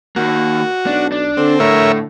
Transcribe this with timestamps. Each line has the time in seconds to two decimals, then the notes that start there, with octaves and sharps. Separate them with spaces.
0.16 D#3 A#3 F#4
0.87 B1 D4
1.12 D4
1.37 D3 C4
1.60 A2 D3 A#4 C#5 E5